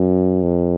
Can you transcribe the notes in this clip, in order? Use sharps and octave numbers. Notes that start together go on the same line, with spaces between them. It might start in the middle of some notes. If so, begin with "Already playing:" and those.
Already playing: F#2
F2